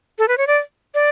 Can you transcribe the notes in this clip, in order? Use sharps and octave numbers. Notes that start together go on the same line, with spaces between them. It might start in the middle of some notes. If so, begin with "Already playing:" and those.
A4
B4
C#5
D5
D5